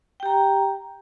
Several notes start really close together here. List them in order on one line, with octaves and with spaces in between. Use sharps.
G5 G4 A#5